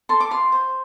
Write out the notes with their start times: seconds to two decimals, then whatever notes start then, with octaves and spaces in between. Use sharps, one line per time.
0.09 A4 C6
0.20 D6
0.31 F4 C6
0.52 C5